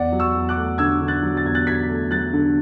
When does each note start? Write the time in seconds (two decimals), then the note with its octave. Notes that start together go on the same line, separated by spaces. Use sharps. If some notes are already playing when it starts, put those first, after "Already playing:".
Already playing: E2 D5 F#5
0.12 F#3
0.20 C#6 E6
0.35 E2
0.49 D6 F#6
0.56 A3
0.78 D3 E6 G#6
1.01 D3
1.08 F#6 A6
1.23 F#3
1.37 A6
1.45 E2 G#6
1.55 F#6 A6
1.67 F#3 G#6 B6
1.89 A3
2.11 F#3 F#6 A6
2.33 D3